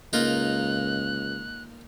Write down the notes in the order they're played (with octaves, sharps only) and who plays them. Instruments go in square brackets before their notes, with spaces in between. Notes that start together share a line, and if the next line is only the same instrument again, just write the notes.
[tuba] C#2 [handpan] G#3 A#3 [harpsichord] D#4 F4 A#4 [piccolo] F#6